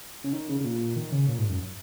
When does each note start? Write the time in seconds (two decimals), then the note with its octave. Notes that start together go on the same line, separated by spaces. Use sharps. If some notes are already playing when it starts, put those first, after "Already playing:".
0.24 C#3
0.33 D#3
0.49 C#3
0.61 C#3
0.65 A#2
0.96 D#3
1.12 C#3
1.29 A#2
1.38 G#2
1.49 F#2